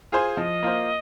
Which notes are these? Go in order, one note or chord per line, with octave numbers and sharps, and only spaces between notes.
F4 G#4 C5 G#5
F3 D#5
A#3 F4 C5